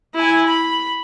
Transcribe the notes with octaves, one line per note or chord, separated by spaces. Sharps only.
E4 G#5
B5